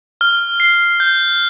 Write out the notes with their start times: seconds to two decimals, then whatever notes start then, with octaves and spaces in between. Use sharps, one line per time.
0.21 F6
0.60 C7
1.00 G6